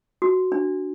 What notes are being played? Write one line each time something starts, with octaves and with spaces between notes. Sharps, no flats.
F#4
D4